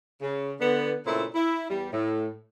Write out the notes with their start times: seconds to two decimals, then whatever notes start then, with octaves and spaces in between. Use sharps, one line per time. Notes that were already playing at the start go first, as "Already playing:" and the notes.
0.21 C#3
0.60 D3 B3
1.06 A#2 C#3 A3 C4 E4
1.34 E4
1.68 E2 G3
1.92 A2